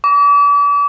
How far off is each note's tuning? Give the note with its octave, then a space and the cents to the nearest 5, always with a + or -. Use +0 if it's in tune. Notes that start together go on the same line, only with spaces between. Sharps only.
D6 -40